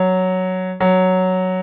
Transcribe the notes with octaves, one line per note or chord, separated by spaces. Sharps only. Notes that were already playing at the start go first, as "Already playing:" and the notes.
Already playing: F#3
F#3